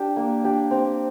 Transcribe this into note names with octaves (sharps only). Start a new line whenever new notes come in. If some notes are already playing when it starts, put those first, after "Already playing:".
Already playing: D4 G4
A#3
D4 G4
C4